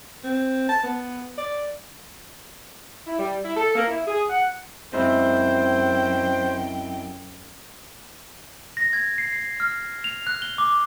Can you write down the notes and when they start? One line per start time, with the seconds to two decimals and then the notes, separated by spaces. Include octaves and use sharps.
0.24 C4
0.69 A5
0.83 B3
1.38 D5
3.06 E4
3.19 G3
3.44 E4
3.56 A4
3.76 A#3
3.87 E4
4.07 G#4
4.30 F#5
4.93 F#2 C3 G#3 E4 C5 G5
8.77 A#6
8.93 G#6
9.18 C7
9.33 C7
9.60 F6
10.04 F7
10.27 F#6
10.42 G7
10.58 D6